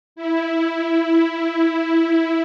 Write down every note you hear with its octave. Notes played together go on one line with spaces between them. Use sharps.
E4